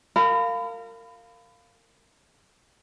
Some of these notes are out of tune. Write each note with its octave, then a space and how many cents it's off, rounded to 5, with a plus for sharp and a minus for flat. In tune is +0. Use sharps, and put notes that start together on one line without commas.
A#4 -30 F5 +0 B5 +25